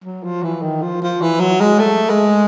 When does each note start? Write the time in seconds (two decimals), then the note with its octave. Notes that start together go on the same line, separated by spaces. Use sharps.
0.04 F#3
0.23 F3
0.43 E3
0.62 D#3
0.82 F3
1.02 F3
1.22 E3
1.40 F#3
1.60 G#3
1.79 A3
2.10 G#3